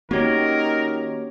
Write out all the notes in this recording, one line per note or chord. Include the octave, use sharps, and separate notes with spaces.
D#3 A#3 C#4 F#4 G4 A#4 C#5